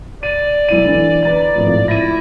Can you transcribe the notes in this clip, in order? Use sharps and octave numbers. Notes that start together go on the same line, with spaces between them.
D5 D#7
B1 E4 D#7
D3 E3
B4 A#5 A6
G#1 A2 F3
E4 A#6 D#7